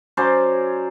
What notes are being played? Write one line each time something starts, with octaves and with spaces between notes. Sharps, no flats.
F#3 C#4 C5 D5